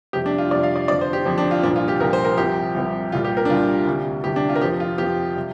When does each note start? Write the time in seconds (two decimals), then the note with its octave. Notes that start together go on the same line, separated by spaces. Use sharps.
0.13 F2 C3 G3 G4
0.26 D4
0.38 F4
0.51 F2 C3 G3 D5
0.63 F5
0.76 D5
0.88 F2 D3 F3 D5
1.01 C5
1.13 G4
1.25 F2 D3 F3 D4
1.38 D4
1.51 F4
1.63 C2 A#2 F3 D4
1.76 F4
1.88 G4
2.00 C2 A#2 F3 A#4
2.13 C5
2.25 A#4
2.37 C2 C3 F3 G4
2.75 C2 C3 F3
3.12 C2 A#2 G3 F4
3.25 G4
3.37 A#4
3.45 D4
3.50 C2 A#2 G3 F4
3.87 D2 C3 G3
4.24 D2 C3 G3 G4
4.36 D4
4.49 F4
4.56 A#4
4.61 F2 F3 G4
4.80 F4
4.98 F2 F3 G4
5.36 C3 G3